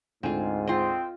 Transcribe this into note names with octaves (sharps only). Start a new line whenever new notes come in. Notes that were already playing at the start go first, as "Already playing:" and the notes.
D2 G#2 C4 F4 G#5 D#7
C4 F4 D#5 G5